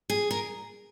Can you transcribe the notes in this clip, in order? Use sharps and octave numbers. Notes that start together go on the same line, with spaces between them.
G#4
A#4